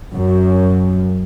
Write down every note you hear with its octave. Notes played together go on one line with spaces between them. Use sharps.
F#2